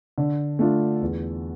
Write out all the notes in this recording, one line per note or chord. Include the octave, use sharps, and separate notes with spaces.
D3
A3 D4 F4
E2